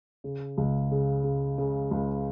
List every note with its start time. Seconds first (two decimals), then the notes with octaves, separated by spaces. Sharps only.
0.24 C#3
0.58 C#2
0.91 C#3
1.24 C#3
1.58 C#3
1.91 C#2